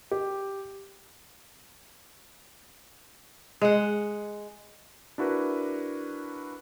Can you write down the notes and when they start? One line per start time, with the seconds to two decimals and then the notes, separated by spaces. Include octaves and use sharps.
0.11 G4
3.61 G#3 F#5
5.18 D4 E4 F#4 A#4 B4